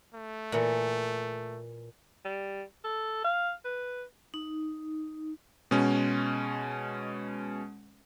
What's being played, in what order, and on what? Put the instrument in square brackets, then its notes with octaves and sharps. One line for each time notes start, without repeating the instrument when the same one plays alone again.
[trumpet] A3
[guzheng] A#2 E3
[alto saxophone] G3
A4
F5
B4
[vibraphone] D#4
[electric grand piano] B2 G#3 C#4